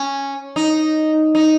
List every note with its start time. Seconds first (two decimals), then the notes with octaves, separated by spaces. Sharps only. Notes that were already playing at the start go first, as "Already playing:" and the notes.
Already playing: C#4
0.56 D#4
1.35 D#4